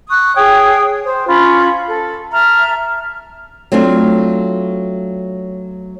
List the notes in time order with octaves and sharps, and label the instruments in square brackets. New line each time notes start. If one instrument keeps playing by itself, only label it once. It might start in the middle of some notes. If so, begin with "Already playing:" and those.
[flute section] C#6 D#6 F#6
G#4 C#5 G5 D#6
C5
C#4 F4 B5
A4
E5 A5 A#5 F6
[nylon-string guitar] F#3 A3 C4 D4 F4